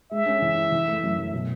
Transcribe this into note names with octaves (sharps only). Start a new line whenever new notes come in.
G#3 E5
C#4
E3
E4
E3
A3
F#2
F#2
B2